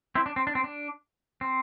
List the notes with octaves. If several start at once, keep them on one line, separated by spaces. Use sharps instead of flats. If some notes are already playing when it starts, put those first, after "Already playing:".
C4 E4
D4
C4
D4
C4
D4
C4